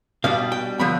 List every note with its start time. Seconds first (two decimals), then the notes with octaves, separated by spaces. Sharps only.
0.24 B2 G3 D4 F5
0.52 G5
0.79 D3 F3 B3 B5